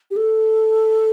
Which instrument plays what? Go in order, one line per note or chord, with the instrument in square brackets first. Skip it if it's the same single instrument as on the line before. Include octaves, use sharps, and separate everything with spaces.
[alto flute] G4
A4